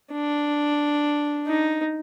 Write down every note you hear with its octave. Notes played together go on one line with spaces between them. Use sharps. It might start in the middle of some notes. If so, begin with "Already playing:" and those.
D4
D#4